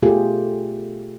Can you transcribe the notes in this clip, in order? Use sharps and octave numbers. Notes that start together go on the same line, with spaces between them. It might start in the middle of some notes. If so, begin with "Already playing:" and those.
B2 A3 F4 G4 G#4